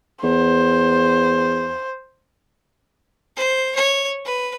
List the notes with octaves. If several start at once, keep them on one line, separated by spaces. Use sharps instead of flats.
E2 C5
C5
C#5
B4